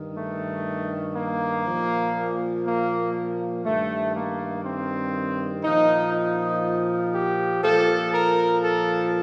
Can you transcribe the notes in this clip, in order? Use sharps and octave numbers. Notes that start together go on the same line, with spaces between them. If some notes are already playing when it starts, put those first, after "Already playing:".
Already playing: G2 D#3
A3
A#3
A#2 F3
A#3
G2 D#3 A3
A#3
C4
A#2 F3 D#4
D#4
G4
A#2 F3 A4
A#4
A4